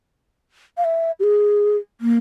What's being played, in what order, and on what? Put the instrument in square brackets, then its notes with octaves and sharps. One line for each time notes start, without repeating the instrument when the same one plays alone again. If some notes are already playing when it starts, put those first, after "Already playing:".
[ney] F5
E5
G4
G#4
A#3